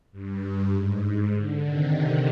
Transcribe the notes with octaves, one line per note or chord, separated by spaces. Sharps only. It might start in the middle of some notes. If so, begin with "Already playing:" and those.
G2
G#2
D3
C3 D#3